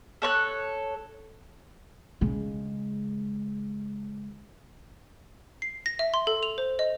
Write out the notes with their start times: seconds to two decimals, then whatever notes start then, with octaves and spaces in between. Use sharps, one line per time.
0.22 A4 C#5 F#6
2.21 C#3 G#3
5.62 C7
5.86 A#6
5.99 E5
6.14 C6
6.27 A4
6.43 F7
6.58 C5
6.79 D#5